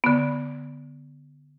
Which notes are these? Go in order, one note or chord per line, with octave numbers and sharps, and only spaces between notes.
D3 B3